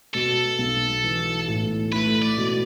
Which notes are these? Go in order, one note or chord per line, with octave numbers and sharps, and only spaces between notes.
B2 A4
B1
E3
A2
A3 B4
D5
B2